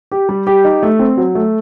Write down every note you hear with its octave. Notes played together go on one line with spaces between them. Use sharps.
G4
G3
G4
D#4
A3
C4
F#3
A3